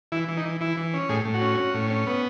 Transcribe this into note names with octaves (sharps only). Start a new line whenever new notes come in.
E3 E4
E3
D#4
E3
E3 E4
E3
C#4
A2 G#4
A2
F#4
C#4
C#4
A2
C#4
B3